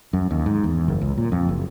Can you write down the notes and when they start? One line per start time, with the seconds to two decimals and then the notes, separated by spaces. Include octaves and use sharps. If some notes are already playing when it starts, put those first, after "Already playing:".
0.13 F#2
0.31 D#2
0.46 G#2
0.64 E2
0.88 F#1
1.02 C#2
1.18 A#2
1.32 F2
1.49 F#1